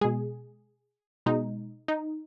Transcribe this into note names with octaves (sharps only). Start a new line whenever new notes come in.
B2 G#3 G#4
B2 G#3 D#4
D#4